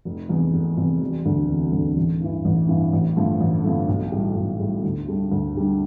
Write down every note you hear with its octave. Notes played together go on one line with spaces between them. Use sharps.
F1
E2 C3
F1
E2 C3
E1
D2 D3
E1
D2 D3
A1
G2 E3
A1
G2 E3
A1
G2 D3 F3 A3
A1
G2 D3 F3 A3
B1
A2 G3
B1
A2 G3
D2
D3 G3 D4
D2
D3 G3 D4